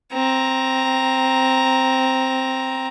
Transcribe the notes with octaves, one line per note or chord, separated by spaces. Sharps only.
C4 A#5